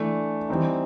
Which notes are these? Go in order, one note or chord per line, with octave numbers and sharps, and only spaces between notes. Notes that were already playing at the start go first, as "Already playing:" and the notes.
Already playing: E3 A3 D4
E3 G3 C4 D#4